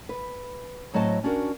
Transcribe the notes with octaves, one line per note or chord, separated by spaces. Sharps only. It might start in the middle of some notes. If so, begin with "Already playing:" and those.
B4
A2 F#3 C4 D#5 A5
C#4 D4 F#4 A#4